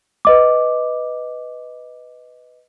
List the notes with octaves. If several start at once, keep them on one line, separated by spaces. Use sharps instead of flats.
B4 D#5 D6